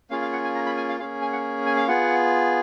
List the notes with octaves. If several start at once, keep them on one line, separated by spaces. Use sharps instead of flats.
A#3 C#4 F4 G#4 F5
F5
F#5
G#5
A#5
B5
G#5
F5
A#3 C#4 G#4 F5
G#5
F#5
G#5
F5
B3 F4 G#4 F#5